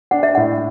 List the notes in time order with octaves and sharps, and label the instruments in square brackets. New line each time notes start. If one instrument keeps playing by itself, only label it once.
[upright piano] D4 [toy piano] F#5
[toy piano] E5
[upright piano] A2 [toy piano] F#5